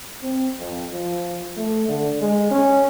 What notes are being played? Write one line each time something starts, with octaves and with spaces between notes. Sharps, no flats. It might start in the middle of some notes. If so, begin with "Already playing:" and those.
C4
F2
F3
A3
D3
G#3
C#4